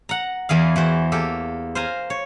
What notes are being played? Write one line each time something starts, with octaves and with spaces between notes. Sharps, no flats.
F#5 A#5
E2 E3 G#4 F5
E3 F#4 C5
A#3 G4 A4
C5 F5 G#5 A#5
C#5